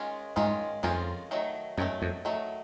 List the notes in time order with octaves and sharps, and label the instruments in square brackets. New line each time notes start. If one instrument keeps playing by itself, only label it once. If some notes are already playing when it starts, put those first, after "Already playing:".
Already playing: [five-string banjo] D#3 G#3 C#4 F4
[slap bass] G#2 [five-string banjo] D#3 G#3 C#4 F4
[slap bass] F2 [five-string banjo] D#3 G#3 C#4 F4
[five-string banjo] D#3 F#3 A3
[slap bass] F#2 [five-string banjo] D#3 F#3 A3
[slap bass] F2
[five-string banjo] D#3 F#3 A3